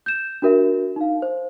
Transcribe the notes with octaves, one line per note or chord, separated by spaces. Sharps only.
G6 E7
D4 F#4 A#4 E5
D#4 F5
C5